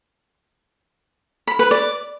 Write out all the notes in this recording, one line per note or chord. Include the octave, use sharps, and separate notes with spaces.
B5
B4
D5